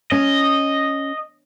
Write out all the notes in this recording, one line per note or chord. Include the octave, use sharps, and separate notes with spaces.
C#4 D#5